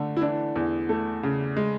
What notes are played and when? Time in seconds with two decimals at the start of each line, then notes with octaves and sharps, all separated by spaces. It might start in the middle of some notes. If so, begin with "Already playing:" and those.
Already playing: D3 A3
0.17 E4
0.21 E3 D4
0.56 E2
0.89 A3
1.23 C#3
1.57 G#3